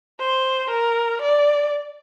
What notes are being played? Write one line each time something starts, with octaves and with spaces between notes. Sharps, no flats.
C5
A#4
D5